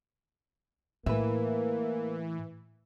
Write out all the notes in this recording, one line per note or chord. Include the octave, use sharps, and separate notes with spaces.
A2 E3 A#3 B4 E5